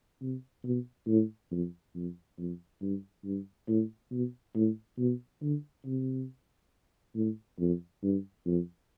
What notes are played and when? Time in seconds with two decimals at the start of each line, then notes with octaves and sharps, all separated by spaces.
0.21 C3
0.65 B2
1.08 A2
1.52 F2
1.95 F2
2.39 F2
2.82 G2
3.25 G2
3.68 A2
4.11 B2
4.55 A2
4.99 B2
5.42 D3
5.86 C3
7.16 A2
7.59 F2
8.03 G2
8.46 F2